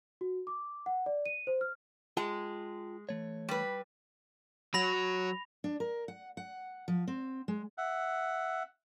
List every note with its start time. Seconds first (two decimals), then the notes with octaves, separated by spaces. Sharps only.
0.21 F#4
0.47 D6
0.86 F#5
1.06 D5
1.26 D#7
1.47 C5
1.61 F6
2.17 G#3 F4 G5 A5
3.09 E3 A3 C#5
3.49 G3 B4
4.74 F#3 F#4 B5 A#6 F7
5.64 D4
5.80 A#4
6.08 F#5
6.37 F#5
6.88 F3
7.07 C4
7.48 G#3
7.78 E5 F#5